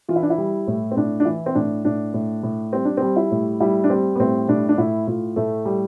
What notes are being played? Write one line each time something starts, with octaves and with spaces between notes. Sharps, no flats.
E3 F4
E4
D4
E4
G3
A2
C4
A2 D4
D4
E3 E4
C4
A2 D4
A2 D4
A2
A2
G3 C4
D4
G3 C4
E4
A2
G3 E4
D4
G3 C4
B3
A2 C4
A2 D4
D4
A2 E4
A2 F4
A2 A3
G3